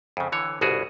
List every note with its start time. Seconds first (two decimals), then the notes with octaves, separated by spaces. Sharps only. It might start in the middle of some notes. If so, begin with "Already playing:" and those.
0.17 F2 C#3
0.32 D3 E3 C#5
0.61 G1 C2 B2 F#4 G#4